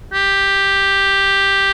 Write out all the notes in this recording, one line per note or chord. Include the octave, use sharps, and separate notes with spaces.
G4